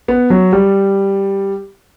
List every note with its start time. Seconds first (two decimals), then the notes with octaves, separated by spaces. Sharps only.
0.08 B3
0.30 F#3
0.52 G3